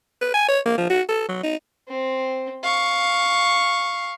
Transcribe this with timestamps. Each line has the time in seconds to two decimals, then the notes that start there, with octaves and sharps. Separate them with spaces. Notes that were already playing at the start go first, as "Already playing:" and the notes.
0.21 B4
0.34 G#5
0.49 C#5
0.66 A#3
0.78 F3
0.90 F#4
1.09 A4
1.29 F#3
1.43 D#4
1.88 C4
2.63 F5 C#6